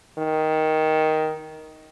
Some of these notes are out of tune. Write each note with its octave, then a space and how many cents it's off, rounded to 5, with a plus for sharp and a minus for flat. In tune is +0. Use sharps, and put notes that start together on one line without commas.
D#3 +10